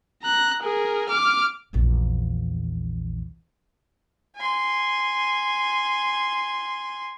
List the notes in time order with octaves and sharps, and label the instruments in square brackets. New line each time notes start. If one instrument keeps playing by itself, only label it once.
[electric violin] A#5 F#6
G#4 A#4
D6 F6
[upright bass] A#1 E2
[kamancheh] G#5 C6